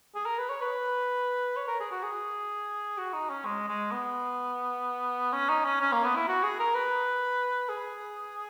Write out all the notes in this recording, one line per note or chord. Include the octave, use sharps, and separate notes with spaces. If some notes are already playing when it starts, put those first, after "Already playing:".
G#4
A#4
B4
C#5
B4
C#5
A#4
G#4
F#4
G#4
F#4
D#4
C#4
G#3
G#3
B3
C#4
D#4
C#4
C#4
A#3
B3
E4
F#4
G#4
A#4
B4
G#4